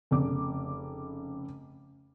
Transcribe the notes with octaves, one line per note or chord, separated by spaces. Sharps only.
F1 C#3 D6